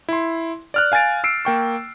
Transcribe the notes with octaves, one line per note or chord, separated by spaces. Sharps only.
E4 C6
D5 F6 F#6
F5 G#5 F#6 A6 D7
E6 C7 D7
A#3 G5 C#6